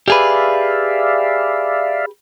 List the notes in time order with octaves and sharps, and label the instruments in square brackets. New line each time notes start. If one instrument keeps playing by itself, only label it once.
[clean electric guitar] G4 G#4 B4 [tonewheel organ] D5 E5 F5